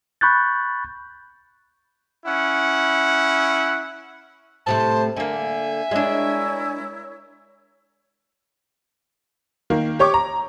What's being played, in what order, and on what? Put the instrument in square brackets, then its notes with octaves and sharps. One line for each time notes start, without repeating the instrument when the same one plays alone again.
[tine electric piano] B5 C#6 F#6 G6 A6
[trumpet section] C#4 E4 F#5
[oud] A2 C3 A3 [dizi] C5 [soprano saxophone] A5
[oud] D3 A#3 [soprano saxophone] E5 [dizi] G#5
[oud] G#3 D4 [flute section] E4 A#4 C#5
[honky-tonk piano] D#3 A#3
G4 C#5 C#6 D6
A#5